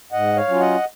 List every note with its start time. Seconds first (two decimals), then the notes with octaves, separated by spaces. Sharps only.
0.12 G#2 D#5 F#5
0.36 C#5 F5
0.48 F#3 C#4 F4
0.60 D#5 F#5